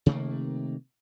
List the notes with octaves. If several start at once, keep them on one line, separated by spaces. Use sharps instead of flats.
C3 D#3 A3 A#3